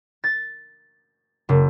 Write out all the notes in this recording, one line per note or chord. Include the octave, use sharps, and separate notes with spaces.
A6
F#1